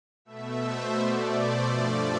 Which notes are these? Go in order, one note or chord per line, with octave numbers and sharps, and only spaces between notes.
B2 A3 E5
C5
B2 A3 D5
C5
G2 F3 A3 D5